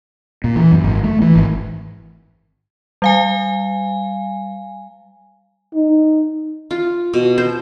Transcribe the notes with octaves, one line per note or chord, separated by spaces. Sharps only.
A#2
E3
F#2
G#1
A3
E3
G#1
G3 F5 G#5
D#4
F4
B2
C5